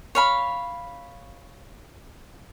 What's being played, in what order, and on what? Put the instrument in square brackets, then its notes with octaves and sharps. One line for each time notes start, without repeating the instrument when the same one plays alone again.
[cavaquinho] C#5 F5 B5